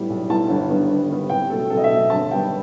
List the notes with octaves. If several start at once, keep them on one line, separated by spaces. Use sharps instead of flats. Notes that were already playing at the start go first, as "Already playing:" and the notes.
Already playing: A2 G3 B3
B1
A2 G3 B3 A5
G1
G2 D#3 G3 B3
G1
G2 D#3 G3 B3
C2 G5
B2 A3 A4
C2 A4
D#5
E5
B2 A3
G1 A5
G2 D#3 G3 B3 G5